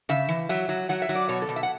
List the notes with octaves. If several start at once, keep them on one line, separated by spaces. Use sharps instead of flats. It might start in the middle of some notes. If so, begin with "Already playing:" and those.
C#3 E5
E3
F#3 E5
F#3
F#3 F#5
E5
F#3
D5
B2 C#5
A4
B2
E5
F#5